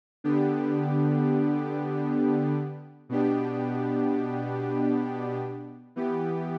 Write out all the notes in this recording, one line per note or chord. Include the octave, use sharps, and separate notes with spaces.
D3 B3 D4 G4
B2 B3 D4 G4
E3 B3 G4